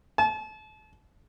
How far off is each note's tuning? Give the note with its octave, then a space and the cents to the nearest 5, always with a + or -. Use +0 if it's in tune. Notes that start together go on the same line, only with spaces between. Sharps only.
A5 -35